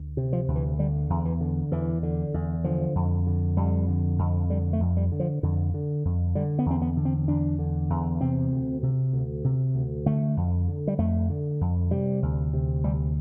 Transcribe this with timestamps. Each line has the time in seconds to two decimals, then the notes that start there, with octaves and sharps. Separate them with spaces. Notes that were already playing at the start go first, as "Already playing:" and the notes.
Already playing: D2
0.17 C3
0.33 F3
0.48 D2
0.55 E3
0.79 D3 G3
1.10 E2
1.25 E3
1.41 D3
1.71 E2 E3
2.03 D3
2.34 E2
2.64 D3 F3
2.95 F2
3.27 D3
3.57 F2 G3
3.88 D3
4.19 F2
4.50 D3 G3
4.73 A3
4.81 F2
4.97 G3
5.12 D3
5.20 F3
5.43 F2 D3
5.74 D3
6.05 F2
6.35 D3 G3
6.59 B3
6.66 E2 C4
6.82 B3
6.97 D3
7.05 C4
7.28 E2 D4
7.59 D3
7.90 E2
8.21 C3 C4
8.52 D2
8.83 C3
9.13 D2
9.44 C3
9.75 D2
10.06 D3 A3
10.37 F2
10.68 D3
10.87 G3
10.98 F2 A3
11.30 D3
11.61 F2
11.91 C3 G3
12.23 D2
12.53 C3
12.84 D2 G3